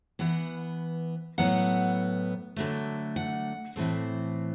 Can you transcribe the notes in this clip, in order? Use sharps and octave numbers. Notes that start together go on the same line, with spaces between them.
E3 B3 F#5
A2 F#3 B3 F#5
D3 F#3 A3
F#5
A2 E3 A3 C4